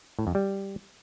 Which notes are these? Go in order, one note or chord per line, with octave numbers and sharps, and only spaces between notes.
A2
F2
G3